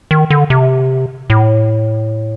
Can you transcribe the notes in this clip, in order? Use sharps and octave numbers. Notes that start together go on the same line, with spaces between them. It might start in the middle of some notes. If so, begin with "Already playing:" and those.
D#3
D3
C3
A2